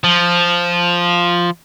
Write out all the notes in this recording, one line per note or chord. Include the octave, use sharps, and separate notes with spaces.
F3